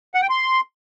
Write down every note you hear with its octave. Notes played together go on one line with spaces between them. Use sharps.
F#5
G5
C6